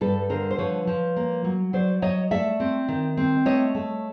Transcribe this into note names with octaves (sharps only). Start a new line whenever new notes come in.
G2 A4 B4
D3 A#4 C5
C5
F3 B4 C#5
F3
A#3
F#3
F#3 C5 D5
F#3 C#5 D#5
A3 D5 E5
C4
D#3
C4
A3 C#5 D#5
A3